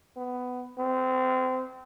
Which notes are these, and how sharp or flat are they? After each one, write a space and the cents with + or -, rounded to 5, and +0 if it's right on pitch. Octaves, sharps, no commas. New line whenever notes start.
B3 +15
C4 -25